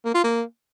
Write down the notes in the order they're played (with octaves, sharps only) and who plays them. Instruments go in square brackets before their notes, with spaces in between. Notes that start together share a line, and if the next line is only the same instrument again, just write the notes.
[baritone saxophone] A#3
F4
A#3